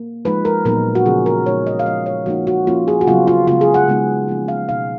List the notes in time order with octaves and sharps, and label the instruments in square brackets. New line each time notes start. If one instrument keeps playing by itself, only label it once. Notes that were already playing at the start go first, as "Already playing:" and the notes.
Already playing: [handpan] A#3
F3 G#3 D#4 B4
A#4
A#2 F#3 B3 D#4 A#4
F#4
C#3 F3 A#3 C#4 G#4
A#4
A#2 G#3 B3 D#4 C#5
D#5
F5
F3 G#3 C#4 D#5
C#5
F3 A#3 D#4 F#4
F#4
F3 A#3 C#4 F4
G#4
F#4
C#3 F#3 B3 F4
F4
C#3 G#3 B3 F4
G#4
F#5
C#3 G#3 B3 D#4
F3 A#3 C#4
F5
B2 G#3 B3 D#4 F5